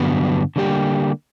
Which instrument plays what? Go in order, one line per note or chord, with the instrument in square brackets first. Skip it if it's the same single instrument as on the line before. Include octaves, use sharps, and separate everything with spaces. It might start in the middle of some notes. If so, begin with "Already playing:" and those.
Already playing: [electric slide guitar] G2 D3 F#3 B3
D3 G3 A#3 D#4 G4